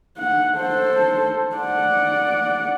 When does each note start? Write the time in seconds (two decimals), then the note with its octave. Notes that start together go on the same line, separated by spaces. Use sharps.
0.18 F#5
0.57 A4 C5
1.56 D5 F#5